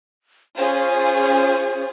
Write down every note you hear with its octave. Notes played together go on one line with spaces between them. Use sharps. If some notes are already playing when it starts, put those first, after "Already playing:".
C#4 F4 G#4 C5